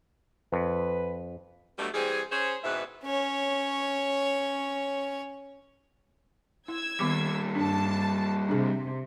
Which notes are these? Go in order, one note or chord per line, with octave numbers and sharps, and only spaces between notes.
F2 B4
B2 D3 F#3 G3 A3
E3 G3 C4 G#4
C#4 G#4 C5
E2 G#2 B2 C4 B4 E5
C#4 C#5
E4 E6 G#6
D#3 G3 A#3 B3 D6
G2 D4 A5
C3 D4 G#4